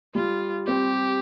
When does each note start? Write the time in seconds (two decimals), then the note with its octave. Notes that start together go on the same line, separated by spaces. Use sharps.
0.15 G3 F4
0.67 C4 G4